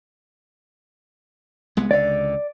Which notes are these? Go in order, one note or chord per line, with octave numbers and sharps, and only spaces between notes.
C2 G#3 B3
C#2 D3 D5